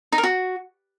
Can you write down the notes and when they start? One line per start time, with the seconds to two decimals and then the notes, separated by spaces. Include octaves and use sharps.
0.12 D#4
0.18 A#4
0.23 F#4